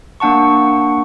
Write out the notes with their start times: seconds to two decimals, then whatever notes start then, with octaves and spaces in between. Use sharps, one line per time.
0.20 A#3 D4 F#5 A5 C#6